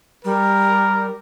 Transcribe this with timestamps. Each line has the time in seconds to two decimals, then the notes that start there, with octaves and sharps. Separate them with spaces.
0.25 G3 A#4